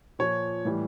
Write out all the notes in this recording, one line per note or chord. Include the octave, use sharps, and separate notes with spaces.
A#2 F3 C#5
A2 E3 G3